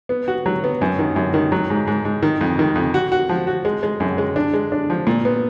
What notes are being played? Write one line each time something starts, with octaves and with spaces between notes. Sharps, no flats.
B3
F#4
F#3
B3
F#2
D#3
F#2
D#3
F#3
G#2
G#2
G#2
D#3
F2
D#3
F2
F#4
F#4
F3
F#4
G#3
G#3
F#2
G#3
D4
G#3
D4
F3
A#2
B3